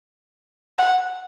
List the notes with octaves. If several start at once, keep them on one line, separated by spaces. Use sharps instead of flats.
F#5